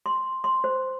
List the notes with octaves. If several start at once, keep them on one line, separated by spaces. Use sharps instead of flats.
C6
C6
C5